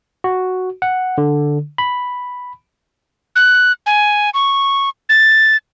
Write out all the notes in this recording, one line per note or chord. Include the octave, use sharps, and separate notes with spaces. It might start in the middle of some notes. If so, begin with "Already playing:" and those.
F#4
F#5
D3
B5
F#6
G#5
C#6
A6